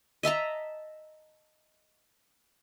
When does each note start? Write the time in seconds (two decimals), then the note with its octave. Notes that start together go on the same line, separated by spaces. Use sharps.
0.23 D#5 E5 A5 A#5